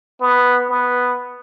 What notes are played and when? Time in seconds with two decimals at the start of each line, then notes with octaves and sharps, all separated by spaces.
0.21 B3
0.70 B3